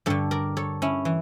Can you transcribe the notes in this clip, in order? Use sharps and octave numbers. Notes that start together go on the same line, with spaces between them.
G2 D3 A4 C#5
A#4 D5
A4 C#5
C#4 E4
E3